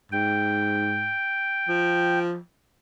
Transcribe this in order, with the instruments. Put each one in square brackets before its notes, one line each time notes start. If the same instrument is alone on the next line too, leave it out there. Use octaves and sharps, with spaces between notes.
[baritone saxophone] G#2 [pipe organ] G5
[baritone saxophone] F3